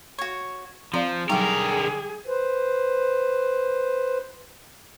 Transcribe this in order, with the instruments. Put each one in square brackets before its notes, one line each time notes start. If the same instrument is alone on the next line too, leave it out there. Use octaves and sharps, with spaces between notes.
[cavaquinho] F#4 C#5
[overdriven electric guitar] F3 [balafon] C4 D5 F5 [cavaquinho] C5
[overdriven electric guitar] D3 A#4 [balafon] F#3 G3 D#4 [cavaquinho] G4 G5 [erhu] G#4
[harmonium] B4 C5